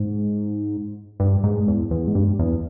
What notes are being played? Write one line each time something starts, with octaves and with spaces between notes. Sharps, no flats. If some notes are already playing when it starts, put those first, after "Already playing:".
Already playing: G#2
G2
G#2
E2
E2
G#2
G2
E2